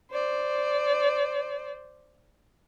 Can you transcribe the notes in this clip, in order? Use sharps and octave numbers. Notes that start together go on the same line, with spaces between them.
C5 D5